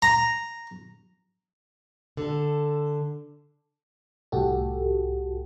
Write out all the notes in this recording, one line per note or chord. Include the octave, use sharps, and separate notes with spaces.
A#5
D3 A4
C2 A2 F#4 G4 A4